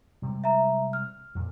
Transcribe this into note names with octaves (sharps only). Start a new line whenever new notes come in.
C3 G3 G#3
E5 A#5
F6
F2 A#2